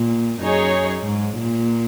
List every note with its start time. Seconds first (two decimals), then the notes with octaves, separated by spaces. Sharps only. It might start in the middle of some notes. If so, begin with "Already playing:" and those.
Already playing: A#2
0.40 F#2 D#4 G#4 C#5
1.05 G#2
1.37 A#2